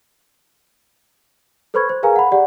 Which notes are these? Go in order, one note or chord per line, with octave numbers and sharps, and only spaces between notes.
A4 B4 C5 B5 C#6 G#6
C5
G#4 A#4 B4 F5 G#5 A#5
F#5 B5
G4 D5 F#5